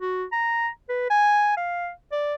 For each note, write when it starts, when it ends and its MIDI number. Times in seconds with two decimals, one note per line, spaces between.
0.01 0.24 66
0.32 0.68 82
0.89 1.06 71
1.10 1.54 80
1.57 1.90 77
2.12 2.35 74